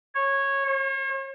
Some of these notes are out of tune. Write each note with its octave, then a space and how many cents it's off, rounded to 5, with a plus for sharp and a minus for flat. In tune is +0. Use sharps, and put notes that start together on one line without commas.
C#5 -15
C#5 -45